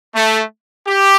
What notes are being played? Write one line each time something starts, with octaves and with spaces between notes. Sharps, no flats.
A3
G4